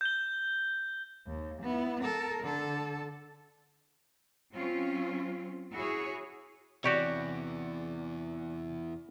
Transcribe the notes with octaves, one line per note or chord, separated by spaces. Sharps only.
G6 G7
D#2
B3 E4
A4 A#4
D3 A4
F#3 C4 C#4 F4
E4 F#4 G#4 C#5
E2 C3 E3 F#4 G4 C#5 D5 C#6